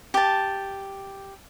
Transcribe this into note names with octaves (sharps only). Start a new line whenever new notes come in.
G4 A5